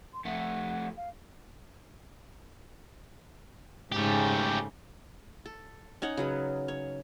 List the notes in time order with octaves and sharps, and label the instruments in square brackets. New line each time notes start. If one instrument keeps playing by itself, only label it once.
[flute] C6
[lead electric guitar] F2 A3 [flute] F#5
[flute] F5
[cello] G#2 C#3 [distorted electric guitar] A3 G4
[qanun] A4
C#4 D#4 C#5 F#5
C#3 F#3 B4
C#5